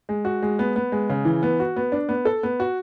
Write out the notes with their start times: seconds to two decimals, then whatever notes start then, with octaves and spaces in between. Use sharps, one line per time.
0.09 G#3
0.25 F#4
0.42 G#3
0.59 B3
0.76 B3
0.92 G#3
1.10 C#3
1.25 E3
1.43 B3
1.60 F#4
1.76 B3
1.92 D4
2.09 B3
2.25 A4
2.43 B3
2.60 F#4